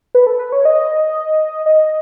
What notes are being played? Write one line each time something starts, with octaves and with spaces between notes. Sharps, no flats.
B4
A4
B4
C#5
D#5
D#5